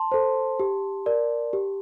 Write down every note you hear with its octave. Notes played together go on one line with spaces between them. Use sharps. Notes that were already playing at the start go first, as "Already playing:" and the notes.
Already playing: A5 C6
A4 C5
G4
A#4 D5
G4